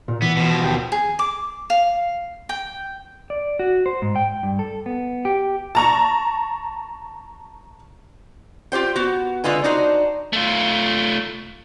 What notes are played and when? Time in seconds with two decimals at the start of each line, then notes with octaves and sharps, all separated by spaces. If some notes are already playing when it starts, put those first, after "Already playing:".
0.08 A#2
0.22 E3 B3
0.37 B2 F3
0.62 D#2 G5
0.92 G#4
1.19 D6
1.70 F5
2.49 G5
3.30 D5
3.59 F#4
3.86 C5
4.02 G#2
4.16 G5
4.43 G2
4.59 A4
4.86 B3
5.25 G4
5.75 A5 A#5 C#6
8.72 F4 G4 C5 G5
8.96 B3 F#4
9.44 D3 G#3 F4 B4 G#5
9.64 D4 D#4 F#4 C5
10.33 A3 F4